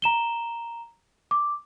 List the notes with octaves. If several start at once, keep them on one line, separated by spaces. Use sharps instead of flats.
A#5 E7 G7
D6